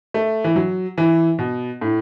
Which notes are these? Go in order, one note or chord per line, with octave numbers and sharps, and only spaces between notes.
A3
E3
F#3
E3
B2
A2